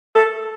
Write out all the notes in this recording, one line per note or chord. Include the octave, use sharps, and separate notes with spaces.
A4